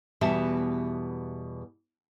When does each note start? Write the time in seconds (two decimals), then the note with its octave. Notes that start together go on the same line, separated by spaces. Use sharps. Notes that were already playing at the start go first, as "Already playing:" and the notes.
0.21 E2 B2 E3 G3 E5 A5